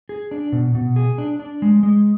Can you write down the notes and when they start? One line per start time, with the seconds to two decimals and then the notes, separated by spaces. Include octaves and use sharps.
0.09 G#4
0.31 D4
0.52 B2
0.75 B2
0.96 G#4
1.18 D4
1.39 D4
1.62 G#3
1.83 G#3